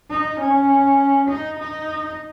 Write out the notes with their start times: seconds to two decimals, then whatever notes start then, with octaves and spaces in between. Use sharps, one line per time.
0.10 D#4
0.40 C#4
1.29 D#4
1.59 D#4